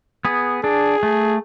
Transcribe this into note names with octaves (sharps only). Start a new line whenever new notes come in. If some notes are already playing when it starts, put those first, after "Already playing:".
B3 G#4
D4 G#4
A3